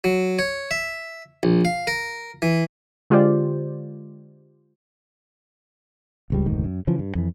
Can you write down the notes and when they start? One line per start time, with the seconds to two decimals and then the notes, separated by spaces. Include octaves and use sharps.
0.04 F#3
0.39 C#5
0.71 E5
1.43 A#1
1.65 F5
1.87 A#4
2.42 E3
3.10 D3 G#3 F4 G4 C5 D5
6.30 D1 C#2 G3
6.46 F1 D2 G#2 D#3
6.64 F#2
6.87 C#3 E3 F3
6.99 G2
7.15 F2 E3